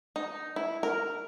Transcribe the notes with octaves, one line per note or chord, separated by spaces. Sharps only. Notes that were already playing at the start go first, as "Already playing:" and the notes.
D#4
E4
A#4